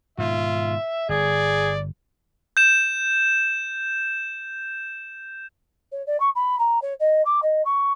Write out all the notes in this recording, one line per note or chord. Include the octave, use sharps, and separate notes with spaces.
G#2 B2 D#3 F4 E5
G1 G#4 D5
G6 E7
C#5
D5
C#6
B5
A#5
C#5
D#5
D6
D#5
C#6